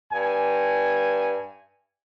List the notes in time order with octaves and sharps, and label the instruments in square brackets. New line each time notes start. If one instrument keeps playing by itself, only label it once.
[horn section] G2 G#5